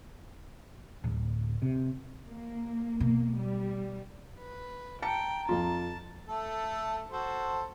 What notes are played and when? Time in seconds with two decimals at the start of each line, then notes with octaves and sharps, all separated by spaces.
1.04 D1
1.62 C3
2.27 A#3
3.00 B2 A#3
3.34 G3
4.39 B4
5.02 G5 A5 A#5 C#7
5.49 F2 F4 A5
6.28 A3 A4
7.10 F#4 A4 C5